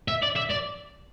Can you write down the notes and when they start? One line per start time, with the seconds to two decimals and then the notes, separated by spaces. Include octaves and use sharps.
0.08 E5
0.22 D5
0.36 E5
0.50 D5